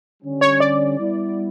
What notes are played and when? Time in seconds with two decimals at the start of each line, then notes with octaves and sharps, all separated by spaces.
0.23 D3 G3 C#4
0.41 C#5
0.60 D5
0.99 G3 B3 E4